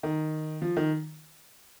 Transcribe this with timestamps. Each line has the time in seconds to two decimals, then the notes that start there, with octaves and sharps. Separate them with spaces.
0.03 D#3
0.62 F3
0.77 D#3